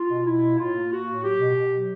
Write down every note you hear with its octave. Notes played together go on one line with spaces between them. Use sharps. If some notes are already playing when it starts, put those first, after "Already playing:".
Already playing: F4
B2
B2 E4
A#3
A2 F4
A#3
A#3 F#4
A2
F#3 G4
B2
B2
F#3